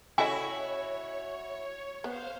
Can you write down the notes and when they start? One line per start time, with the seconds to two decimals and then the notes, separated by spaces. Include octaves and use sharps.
0.18 C#3 E4 F#4 A4 C#5 D#5 E5 G#5
2.04 B3 C5 F5